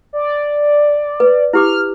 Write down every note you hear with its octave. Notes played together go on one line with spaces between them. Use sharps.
D5
B4
E4 G4 D6 F6